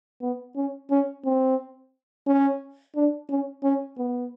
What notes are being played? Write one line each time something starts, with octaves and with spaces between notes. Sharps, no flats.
B3
C#4
C#4
C4
C#4
D4
C#4
C#4
B3